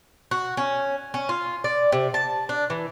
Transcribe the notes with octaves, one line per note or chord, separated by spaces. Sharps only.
F#4
C#4
C#4
F4
D5
C3
A5
D4
E3